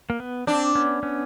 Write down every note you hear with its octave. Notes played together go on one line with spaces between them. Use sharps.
A#3
B3
C4 D4
B3 C#4
B3 C#4